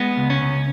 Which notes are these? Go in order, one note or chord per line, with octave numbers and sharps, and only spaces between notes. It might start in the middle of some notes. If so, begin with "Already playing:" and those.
Already playing: G#3 B3
C#2
C#4
C#2